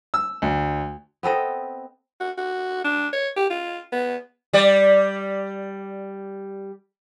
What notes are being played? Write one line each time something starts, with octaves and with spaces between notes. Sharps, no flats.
E6
D2
B3 C4 A4 D#5
F#4
F#4
D4
C#5
G4
F4
B3
G3 D5